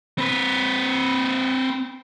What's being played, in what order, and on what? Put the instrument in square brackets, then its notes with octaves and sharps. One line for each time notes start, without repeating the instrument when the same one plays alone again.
[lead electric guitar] C4 B4